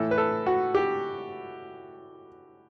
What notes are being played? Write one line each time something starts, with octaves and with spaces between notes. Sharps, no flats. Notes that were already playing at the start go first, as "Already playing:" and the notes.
Already playing: A2 E3 A4
B4
A4
F#4
G4